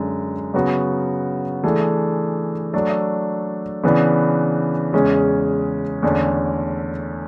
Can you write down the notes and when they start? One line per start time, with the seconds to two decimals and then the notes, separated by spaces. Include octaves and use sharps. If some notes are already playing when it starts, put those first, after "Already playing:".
Already playing: F#2 D3 G#3
0.54 C#3 F#3 B3 F#4
1.64 E3 A3 D4 G#4
2.73 F#3 A3 D4 A4
3.84 C#3 E3 B3 D4
4.93 E2 C#3 G#3 C#4 G#4
6.02 E2 D3 A3 C#4